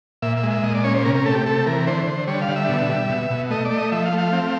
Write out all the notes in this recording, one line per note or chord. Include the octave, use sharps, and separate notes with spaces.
A#2 E5
E5
G#3
E5
A#2 D#5
D5
C#4 C#5
C5
C3 A#4
A#4
A3 A4
G4
C3 A4
E3 A#4
D3 C5
D3
G3 C#5
F5
D3
E5
B2
G3
B2
B2
A3 D#5
D5
A3
D#5
F3 E5
F5
A3
F5
C4